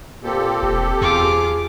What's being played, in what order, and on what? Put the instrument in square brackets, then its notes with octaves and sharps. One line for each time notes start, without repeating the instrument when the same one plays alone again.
[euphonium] A#2 [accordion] C4 G4 A4
[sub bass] E1
[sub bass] E2 [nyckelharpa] F4 D6 [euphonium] G#4